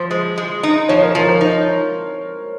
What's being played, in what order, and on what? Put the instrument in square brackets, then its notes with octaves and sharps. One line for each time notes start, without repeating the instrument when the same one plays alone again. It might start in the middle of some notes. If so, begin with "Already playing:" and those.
Already playing: [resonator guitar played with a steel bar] F3 [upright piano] C5
[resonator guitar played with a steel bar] G#3
G#3
D#4
[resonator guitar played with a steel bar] F3 [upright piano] C#5
[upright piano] A#4
[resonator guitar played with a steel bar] F3 [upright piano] A#4
[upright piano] C5
[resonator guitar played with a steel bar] D#4